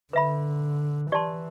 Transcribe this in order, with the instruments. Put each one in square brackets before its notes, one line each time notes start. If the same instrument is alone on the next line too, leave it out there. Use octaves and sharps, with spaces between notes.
[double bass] D3 [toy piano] B4 E5 B5
[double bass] E3 [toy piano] G4 D5 A5 C6